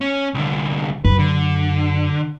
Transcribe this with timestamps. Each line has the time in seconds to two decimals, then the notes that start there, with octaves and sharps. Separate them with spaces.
0.01 C#4
0.34 C2 D3
1.05 F#2 B4
1.19 D3